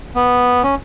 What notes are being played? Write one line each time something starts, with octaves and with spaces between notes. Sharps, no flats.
B3
C#4